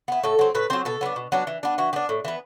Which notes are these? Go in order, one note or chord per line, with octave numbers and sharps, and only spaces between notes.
B3 E4
A2 A4
F#3 C4
A2 B4
F#3 C4 C5
B2 A4
F#3 B3 D4
B2
F#3 B3 D4
E3
B3 D4
E3 F#4
B3 D4 G4
A2
E3 B3